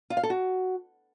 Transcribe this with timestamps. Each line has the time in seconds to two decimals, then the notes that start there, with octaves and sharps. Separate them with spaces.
0.10 F4
0.17 F5
0.23 A4
0.30 F#4